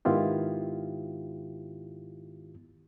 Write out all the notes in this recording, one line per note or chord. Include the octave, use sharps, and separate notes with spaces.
G#2 D#3 B3 E4 F4 G4